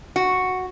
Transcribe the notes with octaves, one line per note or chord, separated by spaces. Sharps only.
F#4